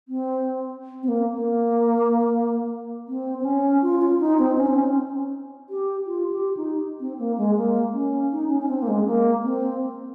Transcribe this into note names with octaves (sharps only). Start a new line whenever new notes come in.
C4
C4
A#3
A#3
C4
C4
C#4
F4
F4
D#4
C4
C#4
C4
C#4
G4
F4
G4
D#4
C4
A#3
G#3
A#3
C#4
D#4
C#4
C#4
C4
A#3
G#3
A#3
C4